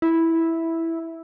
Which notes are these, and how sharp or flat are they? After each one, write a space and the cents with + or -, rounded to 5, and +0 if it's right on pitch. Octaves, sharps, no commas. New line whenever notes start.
E4 -5